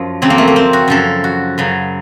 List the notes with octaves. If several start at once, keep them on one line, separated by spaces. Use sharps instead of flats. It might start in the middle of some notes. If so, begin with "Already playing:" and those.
Already playing: F#2 F3
F2 C#3 F#3 C4
A#3
A3
A#3
C4
F#4
F#2 C#3 F3 A4
F#4
F#2 C#3 F#3